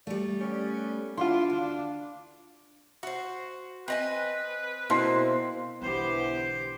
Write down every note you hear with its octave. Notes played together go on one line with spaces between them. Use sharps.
G3 A3 D5
B3 C#4 G4
D4 E4 F4 F5 C6
D2
F#4 C5
C4 B4 D#5 G#5
B2 A#3 C4 E4 C6 C7
B1 D3 E3 B3 G4 C5